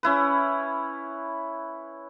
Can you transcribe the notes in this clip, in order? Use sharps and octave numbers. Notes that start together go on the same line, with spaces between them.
C#4 E4 B4